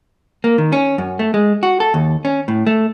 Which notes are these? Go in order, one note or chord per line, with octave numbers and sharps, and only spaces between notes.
A#3
D#3
C#4
F#2
A3
G#3
F#4
A4
D#2
C#4
A2
A3